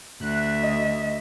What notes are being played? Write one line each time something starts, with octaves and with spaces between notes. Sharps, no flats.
D2 E5 F#6
D#5